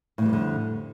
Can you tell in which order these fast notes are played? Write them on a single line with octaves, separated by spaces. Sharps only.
A2 E3 G3 F2 D3